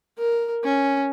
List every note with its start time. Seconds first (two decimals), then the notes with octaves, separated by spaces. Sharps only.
0.18 A#4
0.64 C#4